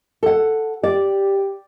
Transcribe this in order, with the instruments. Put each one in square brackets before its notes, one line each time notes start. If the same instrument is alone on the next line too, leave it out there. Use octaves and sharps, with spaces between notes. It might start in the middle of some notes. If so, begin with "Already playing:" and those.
[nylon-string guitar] A4 F#5
[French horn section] G4 [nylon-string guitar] D5